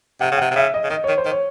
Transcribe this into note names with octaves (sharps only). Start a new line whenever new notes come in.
C3 F#5
C#3
C3 F#5
C3
C#3 E5
D#5
C#3
D#3 D#5
D#3 C#5
C5
D#3
C#5